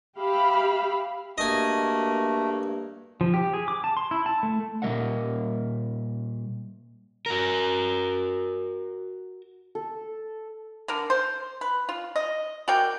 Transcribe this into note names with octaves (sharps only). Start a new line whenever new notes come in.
G4 E5 F5 B5
G2 A3 A#3 F#4 D#5 G#5
F3
G4
G#4
D6
A5
C6
E4
A5
A3
A#2 G3 A#4 D#5 E5 F#5
F#4 A#4
A4
D3 A#4
C5
B4
F4
D#5
F#4 A#4 D5 G5